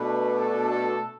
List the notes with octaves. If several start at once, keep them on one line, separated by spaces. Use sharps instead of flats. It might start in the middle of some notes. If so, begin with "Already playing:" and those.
Already playing: B2 A3 D4 B4
A4
A4